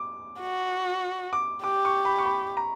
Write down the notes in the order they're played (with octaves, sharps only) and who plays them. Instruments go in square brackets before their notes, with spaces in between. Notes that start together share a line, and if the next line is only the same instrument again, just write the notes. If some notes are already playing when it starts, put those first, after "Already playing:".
Already playing: [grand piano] D6
[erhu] F#4
[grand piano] D6
[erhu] G4 [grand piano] D6
[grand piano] C#6
B5
C#6
B5
A#5